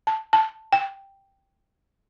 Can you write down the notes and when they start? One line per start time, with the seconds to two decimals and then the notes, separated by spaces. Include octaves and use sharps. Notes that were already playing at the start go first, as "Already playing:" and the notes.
0.07 A5
0.33 A5
0.73 G5